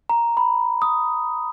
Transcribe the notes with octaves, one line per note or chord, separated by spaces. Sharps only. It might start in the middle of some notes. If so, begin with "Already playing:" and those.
A#5
B5
D#6